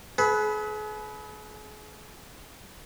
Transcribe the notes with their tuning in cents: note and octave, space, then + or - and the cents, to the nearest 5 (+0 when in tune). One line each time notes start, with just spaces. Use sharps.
G#4 +40 B4 +0